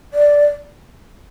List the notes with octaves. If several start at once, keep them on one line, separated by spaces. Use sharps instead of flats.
D5